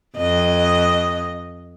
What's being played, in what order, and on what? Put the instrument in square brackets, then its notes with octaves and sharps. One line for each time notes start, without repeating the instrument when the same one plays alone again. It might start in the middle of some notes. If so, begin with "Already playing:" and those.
[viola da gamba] F2 D#5